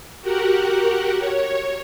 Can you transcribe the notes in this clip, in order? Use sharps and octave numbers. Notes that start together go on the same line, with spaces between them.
F#4 G4 A#4 F#5
C#5